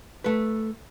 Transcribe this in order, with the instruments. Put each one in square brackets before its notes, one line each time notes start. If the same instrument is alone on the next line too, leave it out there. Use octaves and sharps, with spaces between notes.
[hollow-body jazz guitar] A3 B4